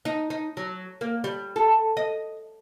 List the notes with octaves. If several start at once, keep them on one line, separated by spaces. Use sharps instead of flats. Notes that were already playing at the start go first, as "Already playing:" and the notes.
D#4
D#4
F#3
A#3
G3
A4
D#5